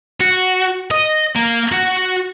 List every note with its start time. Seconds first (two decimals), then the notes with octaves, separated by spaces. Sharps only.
0.20 F#4
0.91 D#5
1.35 A#3
1.71 F#4